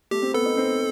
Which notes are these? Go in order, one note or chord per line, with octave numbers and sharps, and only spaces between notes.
A3 G4
C4
B3 A4
D#4
C4